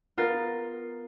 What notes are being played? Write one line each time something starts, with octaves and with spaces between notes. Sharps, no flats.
B3 F4 A#4 A6